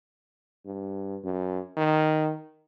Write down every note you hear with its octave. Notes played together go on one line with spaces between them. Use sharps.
G2
F#2
D#3